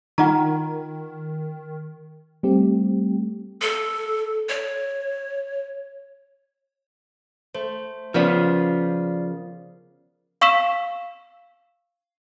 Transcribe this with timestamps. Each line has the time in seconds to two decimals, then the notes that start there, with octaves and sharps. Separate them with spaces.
0.18 D#3 D#4 F4 D#5 F#5 A#5
2.43 G3 A3 C4 G4
3.61 A4
4.49 C#5
7.55 A3 C5
8.14 C#3 F3 B3 A#4 D5 F5
10.41 F5 C#6 E6 B6 E7